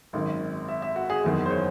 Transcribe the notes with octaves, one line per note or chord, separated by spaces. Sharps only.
G#1 F#2 D#3
E5
E5
F#4
G#4
F#1 E2 D#3
C5
C#5